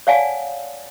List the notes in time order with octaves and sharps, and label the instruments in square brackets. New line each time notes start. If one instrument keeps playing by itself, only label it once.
[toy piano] C#5 D5 F5 F#5 G#5 A5